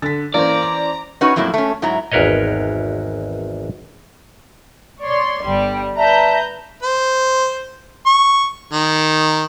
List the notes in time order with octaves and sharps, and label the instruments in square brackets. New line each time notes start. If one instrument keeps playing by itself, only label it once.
[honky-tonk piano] D3 [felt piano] A6 B6
[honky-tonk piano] E3 C#4 C5 [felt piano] A#3 [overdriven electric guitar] D5 [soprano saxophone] A#5
[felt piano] D6
[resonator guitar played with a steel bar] C#4 D#4 F#4 B4 C#5
F2 A2 F#3 A#3 E4
A3 C#4
G#2 F#3 E4 A#5
[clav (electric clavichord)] G#1 E2 A#4 B4 C#5 D#5
[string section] C#5 D5 C6
[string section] G1 G3 [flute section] G5
[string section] B4 A#5 G6 [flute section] D5 E5 A5
[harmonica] C5
C#6
D#3